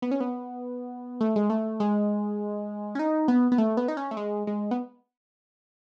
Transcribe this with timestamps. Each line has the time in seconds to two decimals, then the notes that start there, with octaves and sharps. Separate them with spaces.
0.02 B3
0.11 C#4
0.20 B3
1.21 A3
1.36 G#3
1.50 A3
1.80 G#3
2.95 C#4
2.99 D#4
3.28 B3
3.52 B3
3.58 A3
3.77 B3
3.88 D#4
3.97 C#4
4.11 A3
4.17 G#3
4.47 G#3
4.71 B3